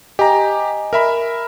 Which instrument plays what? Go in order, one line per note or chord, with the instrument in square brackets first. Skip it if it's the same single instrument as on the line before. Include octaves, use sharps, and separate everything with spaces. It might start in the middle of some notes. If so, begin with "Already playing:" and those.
[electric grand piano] G4 A#5 [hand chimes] D#5 G#5
[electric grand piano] A#4 E5 B5